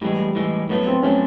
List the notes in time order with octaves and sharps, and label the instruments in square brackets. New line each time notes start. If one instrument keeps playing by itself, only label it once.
[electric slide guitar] A2 E3 G#3 [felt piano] G3
[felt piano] G3
[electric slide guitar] A2 E3 G#3
[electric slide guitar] A2 F#3 A3 [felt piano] B3
[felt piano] C4
[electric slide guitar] A2 F#3 A3 [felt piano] C#4